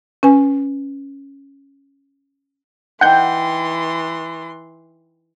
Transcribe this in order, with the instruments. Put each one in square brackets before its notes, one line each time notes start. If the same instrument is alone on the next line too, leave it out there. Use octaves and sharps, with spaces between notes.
[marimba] C#4 B4 G#5
[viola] E3 C6 [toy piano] D#4 D#5 G5 [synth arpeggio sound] F#5 G6